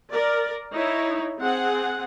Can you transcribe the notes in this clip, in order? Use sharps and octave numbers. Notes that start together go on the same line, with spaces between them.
A#4 D5
D#4 E4 C#5
C4 G#4 F#5